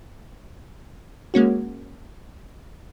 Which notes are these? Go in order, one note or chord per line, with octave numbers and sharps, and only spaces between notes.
G#3 A#3 C#4 F#4